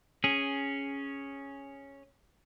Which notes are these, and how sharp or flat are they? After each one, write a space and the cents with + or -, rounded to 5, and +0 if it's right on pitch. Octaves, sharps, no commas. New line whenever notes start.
C#4 +0 G#4 +0